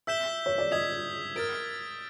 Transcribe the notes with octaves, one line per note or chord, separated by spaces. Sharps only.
E5 E6 G6 B6 E7 G7
C#5
D5
D#5 D#6 G#6 B6
A#4 F6 A6 D7